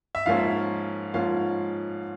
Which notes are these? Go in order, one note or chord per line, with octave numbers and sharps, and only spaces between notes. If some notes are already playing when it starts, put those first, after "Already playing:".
E5
G#2 F3 A#3 C#4 F4 F5
G#2 F3 A#3 C#4 F4 F5